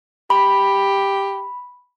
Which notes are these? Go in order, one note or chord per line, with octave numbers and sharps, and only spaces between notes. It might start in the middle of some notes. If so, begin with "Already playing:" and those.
G4 B5